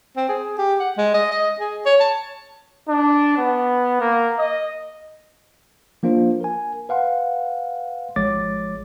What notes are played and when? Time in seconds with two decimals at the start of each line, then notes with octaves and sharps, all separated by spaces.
0.17 C4
0.29 G#4
0.58 G4
0.80 F#5
0.98 G#3
1.14 D#5
1.31 D#5
1.60 G#4
1.86 C#5
2.00 A5
2.89 D4
3.37 B3
4.00 A#3
4.38 D#5
6.03 F3 A#3 D4 F4 C5
6.41 A#4 G#5
6.89 B4 F5 F#5 C6
8.16 G#1 F3 G#3 C#5 D6 A6